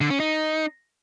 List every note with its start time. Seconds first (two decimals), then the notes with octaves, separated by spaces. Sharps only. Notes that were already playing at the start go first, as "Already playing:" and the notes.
0.01 D3
0.10 C#4
0.20 D#4